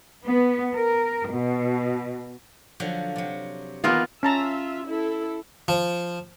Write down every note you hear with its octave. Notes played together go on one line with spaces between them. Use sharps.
B3
A#4
B2
D3 F3 F#3
C3 F#3
D#3 E3 A#3 B3 F4 A#4
C#4 F4 E5 A5 A#5
E4 A4
F3